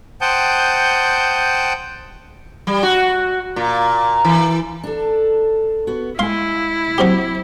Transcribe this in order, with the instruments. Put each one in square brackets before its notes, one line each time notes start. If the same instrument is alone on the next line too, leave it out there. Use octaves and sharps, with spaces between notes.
[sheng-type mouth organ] C5 F#5 G5 A5 D#6 G6
[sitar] G3
F#4
A#2
E3
[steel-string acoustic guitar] D4 A4
B3 F#4
[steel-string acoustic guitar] G#3 G#5 [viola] E4 [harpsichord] F5 C6
[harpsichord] F#3 C4 G4